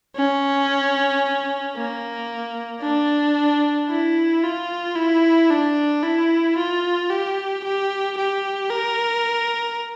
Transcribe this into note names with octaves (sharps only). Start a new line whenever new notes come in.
C#4
A#3
D4
E4
F4
E4
D4
E4
F4
G4
G4
G4
A#4